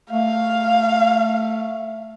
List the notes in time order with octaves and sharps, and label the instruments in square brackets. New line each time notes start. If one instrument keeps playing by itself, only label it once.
[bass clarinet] A3 [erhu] F5